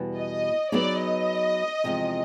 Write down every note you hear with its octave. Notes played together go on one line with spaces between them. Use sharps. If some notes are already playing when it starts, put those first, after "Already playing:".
Already playing: E2 B2 G3 B3
D#5
F#3 B3 D#4 G#4 C#5 D5
D#5
E2 C3 F3 G#3